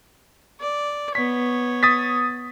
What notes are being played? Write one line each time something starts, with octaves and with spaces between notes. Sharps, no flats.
D5
B3 C#5 B6
D#6 A6 B6